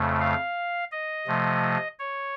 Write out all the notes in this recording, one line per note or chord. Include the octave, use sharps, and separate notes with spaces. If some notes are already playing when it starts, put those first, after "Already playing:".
Already playing: F2 C#3 A3
F5
D#5
C3 F3 A3
C#5